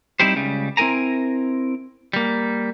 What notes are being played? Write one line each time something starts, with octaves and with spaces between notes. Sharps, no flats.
G3 C4 D#4 E4 G4 C5
C#2 C#3 G3
C4 E4 G#4 A#4 G#5 A#5
G3 A#3